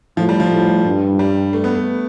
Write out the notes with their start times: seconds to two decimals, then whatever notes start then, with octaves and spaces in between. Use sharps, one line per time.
0.17 A2 F3
0.29 G3
0.40 F3
0.51 A2
0.85 G2
1.19 G3
1.53 A3
1.64 B3
1.75 A3